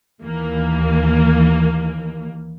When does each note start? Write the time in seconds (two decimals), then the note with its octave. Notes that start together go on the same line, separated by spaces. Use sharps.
0.21 D#2 E3 A#3